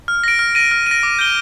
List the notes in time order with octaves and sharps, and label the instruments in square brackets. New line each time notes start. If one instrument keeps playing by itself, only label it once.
[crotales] F6
A#6 D7
F6
A#6 D#7
F6
A#6 D#7
D6
G6 D7 G7